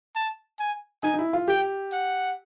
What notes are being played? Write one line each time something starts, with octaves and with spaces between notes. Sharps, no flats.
A5
G#5
D#4 G#5
D#4
E4
F4
G4 G5
F#5